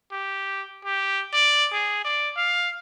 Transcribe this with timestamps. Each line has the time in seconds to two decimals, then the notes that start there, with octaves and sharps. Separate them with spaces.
0.12 G4
0.85 G4
1.33 D5
1.72 G#4
2.05 D5
2.37 F5